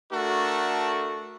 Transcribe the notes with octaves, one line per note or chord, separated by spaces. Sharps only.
A3 D4 F#4 A4 A#4